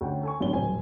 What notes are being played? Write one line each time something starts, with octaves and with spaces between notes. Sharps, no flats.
D2 C#4 F#5 G5
A4 G#5 C#6
G#1 F#2 A2 D4 C#5 G7
D#1 A1 F#2 C5 G#5